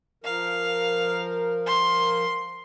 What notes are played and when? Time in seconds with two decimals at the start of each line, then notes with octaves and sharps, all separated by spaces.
0.24 F3 A#4 F5
1.66 C6